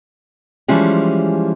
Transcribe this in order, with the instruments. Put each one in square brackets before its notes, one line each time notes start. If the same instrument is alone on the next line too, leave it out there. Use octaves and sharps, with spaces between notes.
[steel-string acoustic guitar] E3 F3 G3 G#3 C#4